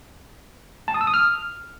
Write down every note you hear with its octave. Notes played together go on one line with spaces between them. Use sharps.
A5
D#6
E6
D#6
F6